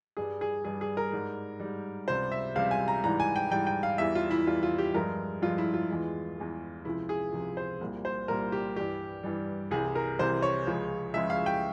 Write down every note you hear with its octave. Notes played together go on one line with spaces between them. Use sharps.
G2 G3 G#4
G#4
G2 G3 G#4
G#4
A#4
G#2 G3
G#2 G3
C#2 C3 G3 C5
E5
C#2 C3 G3 F5
G#5
A#5
G#2 E3 G3 A#5
G#5
G5
G#2 E3 G3 G5
G5
F5
E2 E3 G3 E5
F4
E4
E2 E3 G3 F4
F4
G4
G2 F3 G#3 A#4
G2 F3 G#3 F4
E4
F4
E2 E3 G#3
E2 E3 G#3
C#2 C3 F3 E4
G#4
C#2 C3 F3
C5
C2 A#2 G3
C5
C2 A#2 G3 A#4
G4
G2 E3 G3 G4
G2 E3 G3
C2 C3 E3 G#4
A#4
C2 C3 E3 C5
C#5
C#2 C#3 F3 G#3
C#2 C#3 F3 G#3 E5
F5
G5